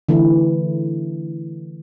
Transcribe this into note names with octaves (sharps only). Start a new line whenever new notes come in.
D3 E3 A3 E4